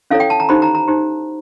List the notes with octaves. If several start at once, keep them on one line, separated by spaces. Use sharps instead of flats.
C#4 E4 A4 C#5 F5
G5
A5
A#5
D#4 G4 C5 B5
A#5
A#5
D#4 G4 C5